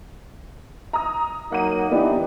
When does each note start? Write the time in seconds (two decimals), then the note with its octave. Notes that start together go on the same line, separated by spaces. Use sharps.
0.93 A#5 D#6
1.52 F#3 A#3 D#4 F#5 D#7
1.91 E3 B3 D4 D#4 G4